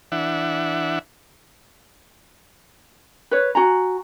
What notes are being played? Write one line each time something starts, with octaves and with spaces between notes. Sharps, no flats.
E3 D4 E5 F#5
B4 C#5
F#4 G#5 A#5